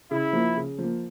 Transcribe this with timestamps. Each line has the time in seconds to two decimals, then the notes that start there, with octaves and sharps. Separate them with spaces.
0.11 C#3 E4
0.33 F3 A#3
0.57 C#3
0.78 F3
0.83 A#3